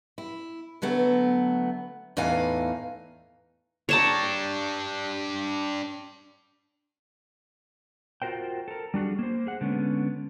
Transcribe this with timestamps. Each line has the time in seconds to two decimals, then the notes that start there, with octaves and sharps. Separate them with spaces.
0.18 E4
0.82 D3 F#3 A3 B3
2.17 E2 A2 E3 D#4 F5 G#5
3.89 D4 G4 C#5 A5 A#5
8.22 F4 F#4 A#4 C5 G5
8.68 A4 A#4
8.94 G3 D4 F#4 G#4
9.19 A#3 C5
9.47 G#4 F#5
9.61 D3 G#3 B3 C#4